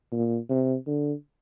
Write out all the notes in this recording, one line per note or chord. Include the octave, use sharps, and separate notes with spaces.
A#2
C3
D3